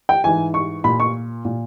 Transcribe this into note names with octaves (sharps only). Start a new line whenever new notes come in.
G5
G#2 E3 G#5
C#6
A#2 B5
C#6
A#2